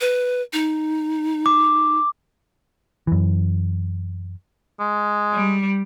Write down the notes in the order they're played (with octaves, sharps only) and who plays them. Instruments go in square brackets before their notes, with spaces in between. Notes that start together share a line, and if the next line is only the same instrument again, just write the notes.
[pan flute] B4
D#4
[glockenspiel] D6
[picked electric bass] F#2 E3
[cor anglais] G#3
[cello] G3